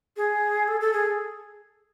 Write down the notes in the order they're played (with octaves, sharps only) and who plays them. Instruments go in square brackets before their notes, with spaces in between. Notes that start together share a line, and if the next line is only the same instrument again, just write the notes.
[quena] G#4
A4
A4
G#4